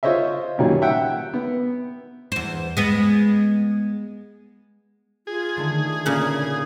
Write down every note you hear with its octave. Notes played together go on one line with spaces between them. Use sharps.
F4 C5 C#5 D#5 E5
F#2 A#2 D#3 F#3 G3
E5 F#5 G5
B3
E2 C5
G#3 B3
F4 G#4
D3 D#3 A3
D#6
A#2 C#3 A#3